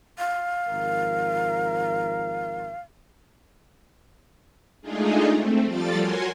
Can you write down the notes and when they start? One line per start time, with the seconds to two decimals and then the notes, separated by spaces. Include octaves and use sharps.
0.19 F5
0.68 G#1 F3 A#4
4.81 G#3 A3 D4 D#4 F4 G#4
5.31 A3 C4
5.64 F3 G3 F4 A4 D5 A6
5.97 F#4 A#4 C#5 G#5 C6